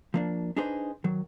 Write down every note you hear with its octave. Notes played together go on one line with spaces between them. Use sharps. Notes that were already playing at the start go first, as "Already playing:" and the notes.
F3 A#3 D4
D4 D#4 G#4 B4 C5
D#3 F#3